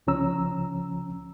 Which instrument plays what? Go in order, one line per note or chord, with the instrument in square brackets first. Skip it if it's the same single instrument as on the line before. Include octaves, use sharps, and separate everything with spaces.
[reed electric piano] C2 C#3 F3 C#4 A#5 E6